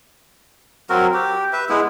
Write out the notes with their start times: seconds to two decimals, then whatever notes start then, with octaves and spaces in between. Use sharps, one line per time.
0.90 F#3 C4 F#4 A#4
1.14 G4
1.53 B4 E5
1.69 G#3 B3 E4